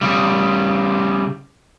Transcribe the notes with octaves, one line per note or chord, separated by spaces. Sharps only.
C#3 G3